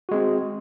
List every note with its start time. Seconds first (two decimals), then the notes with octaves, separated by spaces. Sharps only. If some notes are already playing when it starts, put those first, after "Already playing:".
0.09 F#4
0.11 G#3
0.14 C4